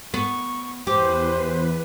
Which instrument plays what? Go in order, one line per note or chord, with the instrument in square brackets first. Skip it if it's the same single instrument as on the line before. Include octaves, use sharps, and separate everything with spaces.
[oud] B3 [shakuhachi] C#6
[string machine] E2 B4 [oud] G4 [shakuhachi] C5